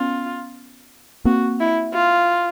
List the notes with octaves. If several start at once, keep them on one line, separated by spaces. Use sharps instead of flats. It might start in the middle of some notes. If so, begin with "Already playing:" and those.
Already playing: B3 C#4 F4
A#3 C4 F#4
E4
F4